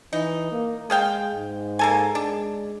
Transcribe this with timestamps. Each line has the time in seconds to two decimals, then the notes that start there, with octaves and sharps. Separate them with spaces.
0.13 E3 D#4
0.52 A#3
0.90 G#3 G#4 F5 G5
1.35 G#2
1.79 A#3 A4 G#5
2.15 G#3 D4